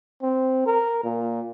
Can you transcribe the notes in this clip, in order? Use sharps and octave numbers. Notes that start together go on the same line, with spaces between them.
C4
A#4
A#2